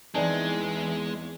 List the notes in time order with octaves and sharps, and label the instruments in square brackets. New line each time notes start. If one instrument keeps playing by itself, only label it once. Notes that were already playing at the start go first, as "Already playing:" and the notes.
[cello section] E2 [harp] E3 C4 D#4 [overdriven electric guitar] G#3 [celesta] D5 G#5 A5